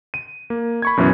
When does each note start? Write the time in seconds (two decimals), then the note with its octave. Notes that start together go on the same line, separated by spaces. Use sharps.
0.14 D#7
0.50 A#3
0.82 B5 C#6 G#6
0.97 F#2 B2 E3 F#3 B3 C#4